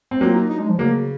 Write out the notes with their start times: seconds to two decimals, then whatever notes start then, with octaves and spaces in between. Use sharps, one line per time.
0.11 C4
0.21 F#3 A#3 F4
0.35 D#4
0.50 D#4
0.59 G#3
0.69 F3
0.78 C#3 F#3 A#3